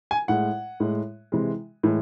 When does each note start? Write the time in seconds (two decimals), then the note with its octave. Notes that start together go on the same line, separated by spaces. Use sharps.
0.11 G#5
0.28 A2 G#3 F#5
0.80 A2 G#3
1.32 C3 E3 G#3
1.83 A2 E3 G#3